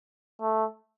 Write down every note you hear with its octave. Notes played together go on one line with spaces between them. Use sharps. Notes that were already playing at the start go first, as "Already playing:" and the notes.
A3